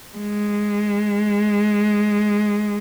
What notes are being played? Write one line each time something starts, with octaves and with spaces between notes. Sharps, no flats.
G#3